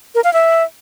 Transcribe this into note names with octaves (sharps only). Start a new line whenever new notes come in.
A#4
F5
E5